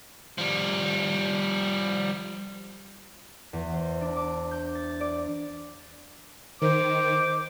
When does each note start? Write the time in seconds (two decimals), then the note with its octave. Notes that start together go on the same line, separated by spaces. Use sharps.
0.38 F3 G3
3.53 E2
3.74 C5
4.01 D4
4.16 D6
4.51 G6
4.75 A6
5.01 D5
6.62 D#3 C5 D6